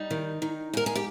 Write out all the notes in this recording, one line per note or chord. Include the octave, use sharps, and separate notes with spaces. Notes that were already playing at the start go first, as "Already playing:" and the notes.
Already playing: G3 D#4
D#3
D#3
G#2 A#4
G#4
G4